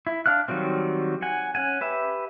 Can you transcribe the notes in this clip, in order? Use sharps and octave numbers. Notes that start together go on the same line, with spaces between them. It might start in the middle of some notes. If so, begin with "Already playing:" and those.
E4
D4 F5 F6 F#6
D#3 F#3 G3 C4
F#5 G#5
C#4 F#5 G#5
G4 B4 E5